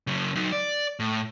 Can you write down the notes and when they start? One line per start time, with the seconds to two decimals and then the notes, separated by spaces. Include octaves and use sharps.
0.07 C#3 F#3
0.35 F#3 D#4
0.52 D5
1.00 A2